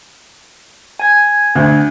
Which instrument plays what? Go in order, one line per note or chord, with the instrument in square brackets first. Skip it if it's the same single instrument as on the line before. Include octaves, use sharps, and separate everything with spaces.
[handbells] G#5 G#6
[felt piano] D2